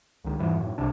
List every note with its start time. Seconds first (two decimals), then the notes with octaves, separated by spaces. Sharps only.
0.24 C#2 D#3
0.39 E2 G#2 E3 G3
0.57 F#2 A2
0.78 C2 C3 D4